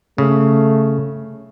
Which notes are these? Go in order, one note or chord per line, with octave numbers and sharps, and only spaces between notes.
C#3 A3